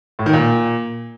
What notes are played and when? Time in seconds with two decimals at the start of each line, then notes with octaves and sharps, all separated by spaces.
0.19 A2
0.26 D#3
0.33 A#2